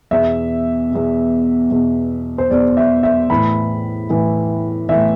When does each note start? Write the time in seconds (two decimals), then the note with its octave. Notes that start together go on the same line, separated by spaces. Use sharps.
0.11 E2 B2 E5
0.91 E2 B2
1.70 E2 B2
2.38 C5
2.50 E2 B2 D5
2.77 E5
3.03 E5
3.30 A2 E3 B5
4.10 A2 E3
4.89 A2 E3 E5